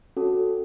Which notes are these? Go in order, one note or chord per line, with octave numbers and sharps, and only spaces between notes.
C#4 F#4 A4